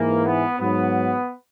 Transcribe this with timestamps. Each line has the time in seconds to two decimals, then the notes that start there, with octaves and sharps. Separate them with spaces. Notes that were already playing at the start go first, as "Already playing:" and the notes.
Already playing: G#2 E3 A#3
0.25 B3
0.59 G#2 F#3 B3